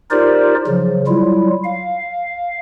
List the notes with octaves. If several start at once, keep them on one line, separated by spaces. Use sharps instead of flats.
D#4 F4 G4 A#4 C5 D5
C#3 F3 F#3
F#3 G3 E4 F4
F5